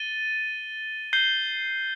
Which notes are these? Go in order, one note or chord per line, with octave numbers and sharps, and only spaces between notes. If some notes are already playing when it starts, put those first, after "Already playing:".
Already playing: A6 D#7 G7
G6 C7 G7